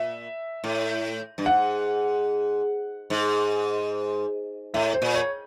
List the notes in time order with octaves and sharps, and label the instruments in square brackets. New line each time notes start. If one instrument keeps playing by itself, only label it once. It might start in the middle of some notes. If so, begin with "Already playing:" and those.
Already playing: [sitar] A#2 [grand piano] E5
[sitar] A2
G2
[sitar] G#2 [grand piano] F#5
[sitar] G#2
[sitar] A2 [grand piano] E5
[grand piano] C5
[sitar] A#2
[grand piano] C#5